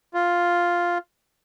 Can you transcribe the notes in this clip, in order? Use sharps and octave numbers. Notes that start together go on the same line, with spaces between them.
F4